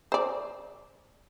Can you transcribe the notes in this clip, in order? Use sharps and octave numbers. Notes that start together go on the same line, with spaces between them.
C5 D5